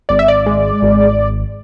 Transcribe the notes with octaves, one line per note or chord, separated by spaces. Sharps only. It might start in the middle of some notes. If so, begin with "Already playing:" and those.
G#1 D5
E5
D5
G#3
G#1